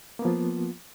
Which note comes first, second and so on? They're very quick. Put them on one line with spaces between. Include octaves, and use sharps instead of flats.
A#3 B3 F3 F4